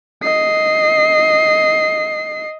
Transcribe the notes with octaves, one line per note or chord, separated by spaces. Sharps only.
D#5 C7